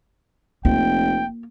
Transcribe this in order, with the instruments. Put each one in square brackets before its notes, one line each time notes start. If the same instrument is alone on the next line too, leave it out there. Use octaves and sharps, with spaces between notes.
[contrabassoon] F1 [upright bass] A#3 F4 [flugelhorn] G5